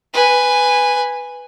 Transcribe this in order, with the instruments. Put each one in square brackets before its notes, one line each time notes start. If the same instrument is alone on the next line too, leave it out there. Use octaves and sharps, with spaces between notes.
[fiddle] B4 G#5